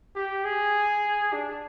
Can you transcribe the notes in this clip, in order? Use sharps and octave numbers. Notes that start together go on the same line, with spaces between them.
G4
G#4
D4